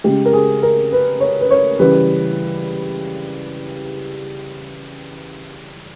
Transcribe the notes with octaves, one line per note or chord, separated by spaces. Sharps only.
C#3 G#3 G4
A#4
G#4
A#4
B4
C#5
B4
C#5
C#3 E3 G3 B4